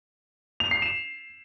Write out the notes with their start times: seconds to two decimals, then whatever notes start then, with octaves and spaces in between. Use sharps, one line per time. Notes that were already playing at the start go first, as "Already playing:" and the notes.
0.60 F7
0.71 C7
0.82 E7